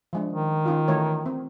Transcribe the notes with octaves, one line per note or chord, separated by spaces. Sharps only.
F3 G#3 D4
D#3
C#4 D#4 F4
E3 A3 C#5
C4